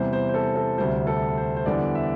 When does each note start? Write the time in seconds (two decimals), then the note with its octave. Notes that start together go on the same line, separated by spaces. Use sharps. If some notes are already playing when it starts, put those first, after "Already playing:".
Already playing: E2 C3 G3 C5
0.13 C5
0.29 C5
0.34 A4
0.56 A4
0.78 D2 C3 G3 C5
1.07 A4
1.37 C5
1.56 C5
1.66 E2 D3 G3 D5
1.95 E5